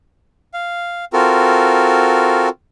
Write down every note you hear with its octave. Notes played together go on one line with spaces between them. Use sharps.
F5
C4 F4 F#4 A4 A#4